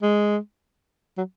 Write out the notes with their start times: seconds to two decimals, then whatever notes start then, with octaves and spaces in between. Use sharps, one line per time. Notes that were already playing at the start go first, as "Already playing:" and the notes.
0.02 G#3
1.18 F#3